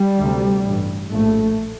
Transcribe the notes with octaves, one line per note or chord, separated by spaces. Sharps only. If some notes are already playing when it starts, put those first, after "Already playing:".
Already playing: G3
D2 C3
A1 G2
A#1 A2 A3